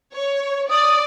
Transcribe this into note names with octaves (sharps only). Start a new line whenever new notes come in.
C#5
D5 D#6